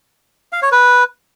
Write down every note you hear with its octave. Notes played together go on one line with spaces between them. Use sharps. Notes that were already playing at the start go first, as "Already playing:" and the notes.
F5
C#5
B4